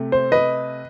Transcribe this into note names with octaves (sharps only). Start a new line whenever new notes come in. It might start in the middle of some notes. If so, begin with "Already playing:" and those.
Already playing: C3 A3
C5
B4 D#5